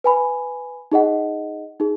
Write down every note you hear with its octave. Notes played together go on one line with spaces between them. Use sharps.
B4 G#5 B5
D#4 G#4 D#5 F#5
D#4 G#4